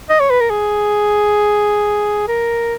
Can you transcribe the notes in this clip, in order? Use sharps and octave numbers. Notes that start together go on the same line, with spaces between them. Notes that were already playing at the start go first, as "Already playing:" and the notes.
D#5
C#5
B4
A#4
G#4
A#4